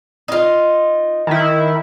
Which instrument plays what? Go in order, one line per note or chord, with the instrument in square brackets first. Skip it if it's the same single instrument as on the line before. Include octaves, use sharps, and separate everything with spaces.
[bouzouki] D#4 F4
[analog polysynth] D#3 E4